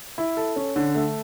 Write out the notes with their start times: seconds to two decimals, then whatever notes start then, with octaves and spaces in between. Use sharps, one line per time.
0.18 E4
0.37 A4
0.56 C#4
0.76 D3
0.95 A3